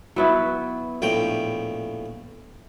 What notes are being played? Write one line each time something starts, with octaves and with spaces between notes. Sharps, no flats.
F#3 B3 E4
A#1 A2 G5